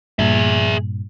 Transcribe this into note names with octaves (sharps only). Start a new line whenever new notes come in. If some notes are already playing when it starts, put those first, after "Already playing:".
G2 A#2 G#4 E5